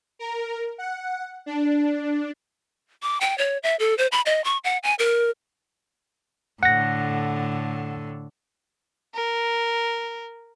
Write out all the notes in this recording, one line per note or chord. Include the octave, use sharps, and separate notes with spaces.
A#4
F#5
D4
D6
G5
C#5
E5
A4
C5
B5
D#5
C#6
F#5
G#5
A#4
A2 D3 F#5 A#6
A#4